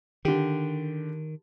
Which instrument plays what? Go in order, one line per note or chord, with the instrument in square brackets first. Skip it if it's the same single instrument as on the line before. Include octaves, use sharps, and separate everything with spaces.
[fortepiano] D3 G4 [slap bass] D#3